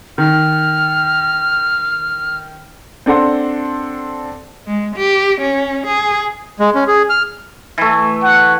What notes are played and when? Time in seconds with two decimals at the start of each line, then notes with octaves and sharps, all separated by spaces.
0.18 D#3 F6
3.06 C4 D4 A4 F#5 C6
4.67 G#3
4.97 G4
5.42 C#4
5.87 G#4
6.60 G#3
6.75 C#4
6.88 G#4
7.10 F6
7.78 E3 A3
8.22 F#5